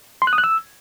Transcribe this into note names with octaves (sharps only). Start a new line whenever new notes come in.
C6
F#6
D#6
F#6
E6